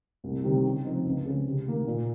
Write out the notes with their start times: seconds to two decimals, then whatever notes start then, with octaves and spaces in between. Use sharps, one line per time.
0.24 C2
0.44 C3 D#3 G3 C4
0.65 C#3
0.85 F3 C4 D#4
1.05 C#2
1.26 C#3 G#3 C4
1.46 C3
1.66 D#3 A#3
1.87 A#2